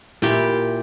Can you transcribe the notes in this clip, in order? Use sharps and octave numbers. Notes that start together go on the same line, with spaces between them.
A#2 E4 G4 A#4